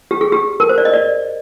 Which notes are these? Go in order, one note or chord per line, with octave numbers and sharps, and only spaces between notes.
G4
G#4
G4
A#4
C5
D5
D#5
D5